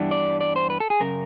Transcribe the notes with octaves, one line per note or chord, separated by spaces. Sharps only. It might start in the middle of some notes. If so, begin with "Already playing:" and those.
Already playing: G2 E3 G3 B3 D4
D5
D5
C5
B4
A4
G#4
F#2 C#3 A#4